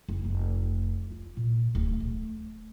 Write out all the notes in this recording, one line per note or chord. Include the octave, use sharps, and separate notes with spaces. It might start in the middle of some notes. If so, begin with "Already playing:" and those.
F#1
F1
F4
A#2
D1
A3